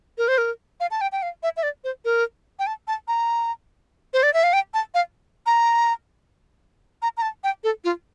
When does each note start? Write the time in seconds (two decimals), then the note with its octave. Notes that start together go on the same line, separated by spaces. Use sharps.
0.18 A#4
0.28 C5
0.38 A#4
0.80 F5
0.91 A5
1.01 G5
1.12 G5
1.22 F5
1.43 E5
1.57 E5
1.63 D5
1.84 C5
2.05 A#4
2.59 G5
2.67 A5
2.88 A5
3.08 A#5
4.14 C5
4.23 D5
4.34 E5
4.43 F5
4.53 G5
4.74 A5
4.94 F5
5.46 A#5
7.02 A#5
7.17 A#5
7.22 A5
7.44 G5
7.64 A4
7.84 F4